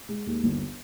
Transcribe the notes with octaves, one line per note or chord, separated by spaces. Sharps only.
G#3
D#2
G1